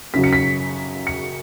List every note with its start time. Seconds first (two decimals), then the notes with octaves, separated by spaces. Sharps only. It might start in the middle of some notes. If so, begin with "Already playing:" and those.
0.14 F#2 C#3 F#3 B6
0.24 C#7
0.33 B6
1.07 C#7